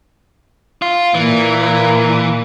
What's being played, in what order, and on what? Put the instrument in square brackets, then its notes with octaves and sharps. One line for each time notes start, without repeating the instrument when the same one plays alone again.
[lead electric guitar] F4
[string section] A#2 [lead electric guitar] E3